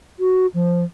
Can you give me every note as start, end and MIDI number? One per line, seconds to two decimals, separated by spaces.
0.19 0.47 66
0.54 0.84 53